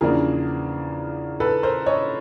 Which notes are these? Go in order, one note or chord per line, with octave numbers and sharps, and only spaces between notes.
E2 C#3 F3 A#3 D4 G#4 A#4
A4 B4
A#4 C5
C#5 D#5